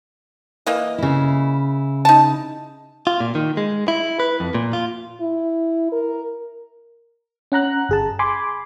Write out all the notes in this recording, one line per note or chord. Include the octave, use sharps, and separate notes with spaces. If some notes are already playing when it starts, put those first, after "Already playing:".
E3 A#3 D#5
C#3 E4
D#4 A5
F4
A#2
D#3
G#3
E4
B4
F2
A#2
F4
E4
A#4
C#4 F#5 A#5 F#6
G1 G#4 A5
G#5 B5 C6 D6